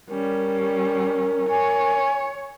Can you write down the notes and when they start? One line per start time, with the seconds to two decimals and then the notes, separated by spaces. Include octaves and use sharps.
0.10 G3 C#4 A#4
1.50 C#5 G#5